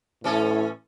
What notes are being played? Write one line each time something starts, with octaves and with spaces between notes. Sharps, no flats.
A2 E3 C#4 A4